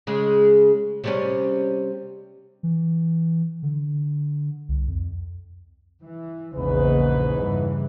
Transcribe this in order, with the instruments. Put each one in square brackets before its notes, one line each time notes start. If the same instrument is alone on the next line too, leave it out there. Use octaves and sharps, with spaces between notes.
[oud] C#3 G#3
C3 G3 C#4
[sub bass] E3
D3
C2
F2
[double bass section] E3
[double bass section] A#1 E2 C#3 [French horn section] G#2 B4
[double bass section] G2 C#3 E3